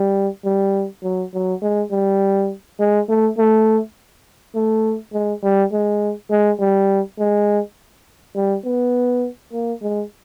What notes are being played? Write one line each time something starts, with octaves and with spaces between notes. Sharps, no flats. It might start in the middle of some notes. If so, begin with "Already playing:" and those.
Already playing: G3
G3
F#3
F#3
G#3
G3
G#3
A3
A3
A3
G#3
G3
G#3
G#3
G3
G#3
G3
B3
A#3
G#3